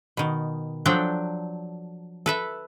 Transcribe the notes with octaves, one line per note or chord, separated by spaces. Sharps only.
B2 D#3
F3 F#3 D4 A4 D5 G5
A4 B4 E5